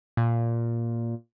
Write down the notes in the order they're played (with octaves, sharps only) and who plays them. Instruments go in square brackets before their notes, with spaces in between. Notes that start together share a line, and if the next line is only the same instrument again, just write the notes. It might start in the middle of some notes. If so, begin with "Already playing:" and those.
[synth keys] A#2